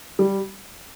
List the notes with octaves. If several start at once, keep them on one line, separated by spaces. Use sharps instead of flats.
G3